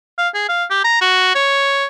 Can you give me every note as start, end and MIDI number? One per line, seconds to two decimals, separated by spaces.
0.18 0.29 77
0.34 0.44 68
0.49 0.64 77
0.70 0.83 67
0.84 0.99 82
1.01 1.34 66
1.35 1.86 73